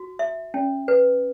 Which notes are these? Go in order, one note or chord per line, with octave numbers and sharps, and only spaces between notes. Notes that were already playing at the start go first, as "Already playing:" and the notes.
Already playing: F#4
E5
C#4
B4